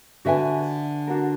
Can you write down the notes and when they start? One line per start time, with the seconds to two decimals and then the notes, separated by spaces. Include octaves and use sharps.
0.25 D3 F#4 B4 E5 G#5
1.07 D4 F#4 A#4